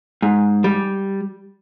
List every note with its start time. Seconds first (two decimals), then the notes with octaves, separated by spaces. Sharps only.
0.22 G#2
0.64 G3